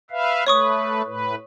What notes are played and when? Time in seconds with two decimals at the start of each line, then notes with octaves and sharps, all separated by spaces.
0.11 B4 E5 F5
0.47 A3 B4 C#5 C#6 D#6
1.04 A2 B4